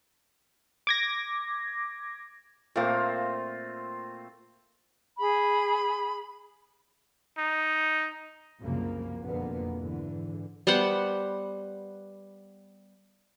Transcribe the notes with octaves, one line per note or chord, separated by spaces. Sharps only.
D6 G#6 A#6
A#2 A3 A#3 C4 F4
G#4 B5
D#4
C2 F#2 C#3 F3 A#3
F#1 F2 B2 D3 A#3 B3
G#2 D3 E3
G3 B3 C5 F#5